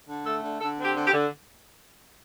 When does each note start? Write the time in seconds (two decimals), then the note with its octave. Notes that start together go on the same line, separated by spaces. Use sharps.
0.08 D3
0.26 A3 A4
0.43 D3
0.61 D3 A4
0.78 C4
0.84 G4
0.95 D3
1.07 G4
1.13 D3